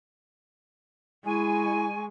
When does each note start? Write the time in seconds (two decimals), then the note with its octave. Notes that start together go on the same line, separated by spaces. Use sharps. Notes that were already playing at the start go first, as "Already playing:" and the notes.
1.26 G#3 E4 G#5 C#6